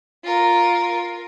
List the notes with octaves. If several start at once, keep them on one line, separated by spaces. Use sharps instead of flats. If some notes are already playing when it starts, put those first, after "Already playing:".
F4 A#4